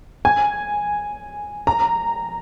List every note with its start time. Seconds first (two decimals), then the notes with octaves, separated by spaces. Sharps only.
0.25 G#5
1.67 A#5